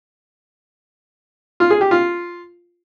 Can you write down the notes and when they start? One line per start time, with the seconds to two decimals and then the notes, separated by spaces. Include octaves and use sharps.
1.60 F4
1.70 G#4
1.81 G4
1.91 F4